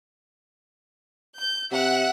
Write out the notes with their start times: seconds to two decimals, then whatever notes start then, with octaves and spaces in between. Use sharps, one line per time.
1.39 G6
1.72 C3 E5 F#5 F#6